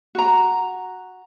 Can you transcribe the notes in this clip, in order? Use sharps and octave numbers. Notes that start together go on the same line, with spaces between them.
F#4 A#5